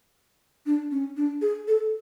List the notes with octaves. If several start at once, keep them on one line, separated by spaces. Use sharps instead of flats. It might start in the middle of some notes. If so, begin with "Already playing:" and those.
D4
C#4
D4
G#4
A4